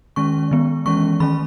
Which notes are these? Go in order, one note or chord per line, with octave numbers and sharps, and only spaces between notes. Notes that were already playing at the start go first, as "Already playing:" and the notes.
D#3 G#3 C#4 C#6
D#3 G#3 B3
E3 G#3 C#4 C#6
D#3 A3 C#4 B5